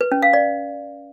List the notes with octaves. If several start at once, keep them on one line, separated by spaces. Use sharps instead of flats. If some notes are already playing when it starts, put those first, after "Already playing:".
B4
C#4
F5
D5